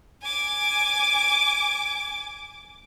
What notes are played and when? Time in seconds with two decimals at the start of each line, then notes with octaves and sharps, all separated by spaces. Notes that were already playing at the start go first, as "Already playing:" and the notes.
0.22 G#5 D6